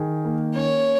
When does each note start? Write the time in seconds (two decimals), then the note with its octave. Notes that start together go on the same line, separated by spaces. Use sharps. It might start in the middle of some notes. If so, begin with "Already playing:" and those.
Already playing: D#3 G#4
0.25 A#3
0.55 C#4 C#5